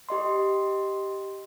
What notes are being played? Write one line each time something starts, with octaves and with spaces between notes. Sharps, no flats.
G4 D#5 C6